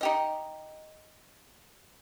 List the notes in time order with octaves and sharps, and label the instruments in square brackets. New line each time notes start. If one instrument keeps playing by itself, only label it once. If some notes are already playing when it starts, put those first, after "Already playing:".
[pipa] D#4 G4 D#5